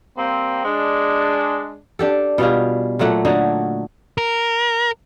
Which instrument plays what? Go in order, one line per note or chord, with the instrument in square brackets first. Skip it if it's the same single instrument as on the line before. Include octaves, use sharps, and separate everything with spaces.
[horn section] G3 A#3 C4
G#3 D4
[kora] D4 G4 A4
B2 G3 F4 G#4
A#2 F#3 A3 F#5
D3 D#4 F#4 C#5
[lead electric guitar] A#4